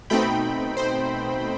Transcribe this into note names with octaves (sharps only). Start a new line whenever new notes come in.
B2 A3 C4 D#4 G5 B5
C5